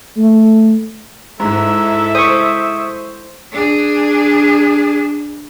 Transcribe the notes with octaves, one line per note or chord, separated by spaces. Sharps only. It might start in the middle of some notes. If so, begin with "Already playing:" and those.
A3
G#2 G#3 E4 A4 E5
C5 C#6 D#6
D4 G#4